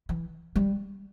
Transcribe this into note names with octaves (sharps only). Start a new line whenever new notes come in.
E3
G3